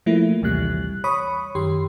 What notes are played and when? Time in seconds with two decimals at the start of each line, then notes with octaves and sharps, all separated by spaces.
0.06 F3 A3 A#3 E4
0.42 A#1 D#2 C3 E3 G3 F#6
1.04 C#5 B5 C#6 D#6
1.55 F#2 D#3 G4 C6